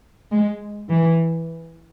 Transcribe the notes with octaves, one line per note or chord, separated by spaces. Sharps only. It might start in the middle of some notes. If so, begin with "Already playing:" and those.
G#3
E3